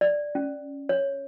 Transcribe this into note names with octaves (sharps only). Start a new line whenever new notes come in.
D5
C#4
C#5